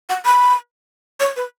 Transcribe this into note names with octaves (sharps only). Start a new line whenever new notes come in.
F#5
B5
C#5
B4